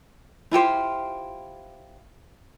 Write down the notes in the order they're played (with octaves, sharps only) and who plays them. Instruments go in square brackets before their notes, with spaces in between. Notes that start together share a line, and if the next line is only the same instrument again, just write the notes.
[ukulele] E4 F4 G4 C5